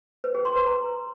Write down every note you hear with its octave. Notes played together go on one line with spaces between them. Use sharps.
B4
G#4
C6
B4
A#5